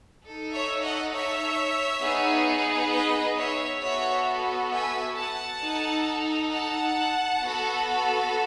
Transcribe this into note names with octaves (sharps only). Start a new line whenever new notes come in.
D#4 A4
C#5 E5
D#5 F#5
C#5 E5
B3 D#4 G#4
B4 D#5
C#5 E5
B3 F#4 A4 C#5 E5
E5 G#5
F#5 A5
D#4 A4
F#5 A5
B3 F#4 A4